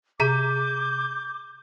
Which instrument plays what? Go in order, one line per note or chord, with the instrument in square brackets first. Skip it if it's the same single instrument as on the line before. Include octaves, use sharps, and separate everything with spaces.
[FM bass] C3 [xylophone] G#4 A#5 B6 [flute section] D6 [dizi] G6